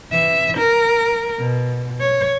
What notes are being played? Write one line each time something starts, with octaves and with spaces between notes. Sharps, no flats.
E3 E5
A#4
B2
C#5